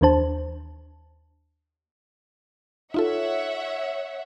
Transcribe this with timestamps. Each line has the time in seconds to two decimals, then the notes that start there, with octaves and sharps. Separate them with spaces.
0.01 D#2 E3 D4 C5 A5
2.94 D#4 F4 A4 C#5 E5 F#5